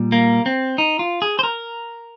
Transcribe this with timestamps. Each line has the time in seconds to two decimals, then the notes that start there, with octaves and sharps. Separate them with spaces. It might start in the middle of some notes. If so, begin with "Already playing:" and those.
Already playing: A#2 G3
0.12 A#3
0.46 C4
0.78 D#4
0.99 F4
1.22 G#4
1.39 C5
1.43 A#4